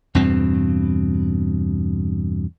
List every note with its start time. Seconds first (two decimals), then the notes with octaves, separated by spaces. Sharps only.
0.15 E2 G2 B2 C4